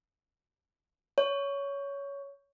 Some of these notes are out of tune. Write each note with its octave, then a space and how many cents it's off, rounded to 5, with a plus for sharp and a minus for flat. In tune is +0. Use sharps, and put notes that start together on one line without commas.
C#5 +15